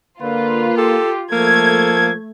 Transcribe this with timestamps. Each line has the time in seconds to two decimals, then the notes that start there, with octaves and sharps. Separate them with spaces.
0.22 D3 A#3 F4 B4
0.77 G4 A4
1.32 F3 A3 A#3 A4 G#6